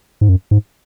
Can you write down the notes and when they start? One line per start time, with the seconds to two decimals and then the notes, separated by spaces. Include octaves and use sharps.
0.21 G#2
0.29 F#2
0.51 G#2